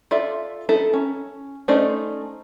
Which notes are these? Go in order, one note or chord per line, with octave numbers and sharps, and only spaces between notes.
F4 A4 D5 E5
D#4 E4 A4
C#4
A3 C#4 D#4 C5 D5